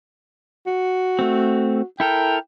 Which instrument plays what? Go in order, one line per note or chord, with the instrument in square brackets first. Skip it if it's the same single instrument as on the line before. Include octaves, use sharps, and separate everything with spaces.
[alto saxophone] F#4
[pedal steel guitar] A3 C4
[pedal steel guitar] E4 A4 A#4 [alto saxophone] G5